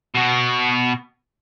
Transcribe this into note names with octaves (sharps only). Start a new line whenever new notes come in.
B2 F#4